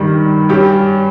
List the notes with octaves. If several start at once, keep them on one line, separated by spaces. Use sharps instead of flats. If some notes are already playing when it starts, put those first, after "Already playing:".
Already playing: G2 D#3 G3
G2 G3 C#4 G4